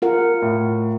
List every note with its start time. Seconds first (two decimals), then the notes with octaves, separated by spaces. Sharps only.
0.02 F4 A#4 F#5
0.42 A2